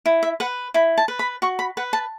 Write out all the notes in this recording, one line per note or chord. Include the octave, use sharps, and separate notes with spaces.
E4
E5
B4 F#5
E4 B5
A5
B4
B5
F#4 C#6
B5
B4 F#5
A5